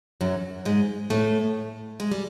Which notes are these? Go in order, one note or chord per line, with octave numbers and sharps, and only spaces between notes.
F#2 F#3
G#2 G#3
A2 A3
G#3
G3